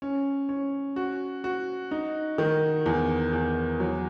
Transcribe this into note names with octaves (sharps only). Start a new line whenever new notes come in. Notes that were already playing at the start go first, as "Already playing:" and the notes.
C#4
C#4
F#4
F#4
D#4
D#3
E2
E2
F#3